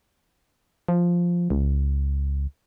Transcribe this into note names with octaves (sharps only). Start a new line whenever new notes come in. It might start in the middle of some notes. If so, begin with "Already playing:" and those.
F3
C#2